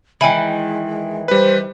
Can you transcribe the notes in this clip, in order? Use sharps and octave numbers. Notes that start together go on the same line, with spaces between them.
D#3 E3 G#3 G5 G#5 B5
G3 B4 C5